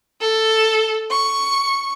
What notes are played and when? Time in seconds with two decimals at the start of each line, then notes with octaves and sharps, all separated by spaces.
0.21 A4
1.11 C#6